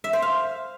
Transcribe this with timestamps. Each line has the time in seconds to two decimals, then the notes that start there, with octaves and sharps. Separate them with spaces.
0.04 E5
0.13 C5
0.22 F5